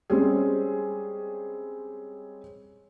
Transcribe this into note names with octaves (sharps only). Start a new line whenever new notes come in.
G3 G#3 C4 C#4 G4 G#4